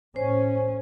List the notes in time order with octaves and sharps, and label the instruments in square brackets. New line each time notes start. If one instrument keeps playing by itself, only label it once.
[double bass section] A2 C#4 [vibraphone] C5